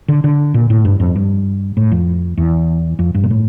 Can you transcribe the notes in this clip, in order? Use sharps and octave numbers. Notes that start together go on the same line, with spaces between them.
D3
D3
A#2
A2
G2
F2
G2
A2
F2
E2
F2
G2
A#2
A2